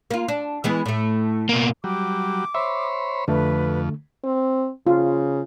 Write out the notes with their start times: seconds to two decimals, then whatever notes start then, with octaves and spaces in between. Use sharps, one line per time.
0.11 A#3 F4
0.28 D4
0.64 E3 G#3 B3
0.86 A2 A3
1.49 B2 A#3
1.84 F#3 G3 D6
2.55 C5 C#5 E5 B5
3.28 F2 D3 A3 B4
4.24 C4
4.87 C#3 F4